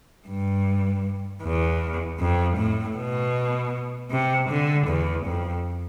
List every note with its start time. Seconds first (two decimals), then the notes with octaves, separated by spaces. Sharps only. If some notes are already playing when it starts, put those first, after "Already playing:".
0.28 G2
1.43 E2
2.20 F2
2.58 A2
2.97 B2
4.11 C3
4.49 D3
4.88 E2
5.26 F2